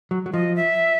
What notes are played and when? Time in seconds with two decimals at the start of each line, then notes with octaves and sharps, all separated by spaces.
0.11 F#3
0.26 F#3
0.33 F3 D#5
0.56 E5